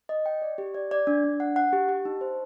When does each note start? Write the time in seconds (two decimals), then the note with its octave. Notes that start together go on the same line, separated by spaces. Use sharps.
0.09 D#5
0.26 G5
0.42 D5
0.58 G4
0.74 D5
0.91 D5
1.07 D4
1.24 D4
1.40 F#5
1.56 F#5
1.73 G4
1.88 G4
2.05 D#4
2.21 C5